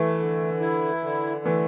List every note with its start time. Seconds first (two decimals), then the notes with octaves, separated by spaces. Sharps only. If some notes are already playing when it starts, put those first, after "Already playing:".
Already playing: E3 A3
0.19 D3
0.60 E4
1.03 D3
1.45 E3 A3